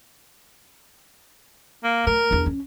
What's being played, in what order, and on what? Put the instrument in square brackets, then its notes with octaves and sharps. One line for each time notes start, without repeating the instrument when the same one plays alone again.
[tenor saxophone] A#3
[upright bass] A3 [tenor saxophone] A#4
[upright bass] E2 D4
C#4